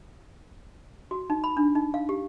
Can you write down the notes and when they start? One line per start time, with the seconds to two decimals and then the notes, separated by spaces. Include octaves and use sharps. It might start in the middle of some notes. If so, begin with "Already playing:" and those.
1.11 F#4
1.30 D#4
1.44 B5
1.57 D4
1.75 D#4
1.94 F5
2.09 G4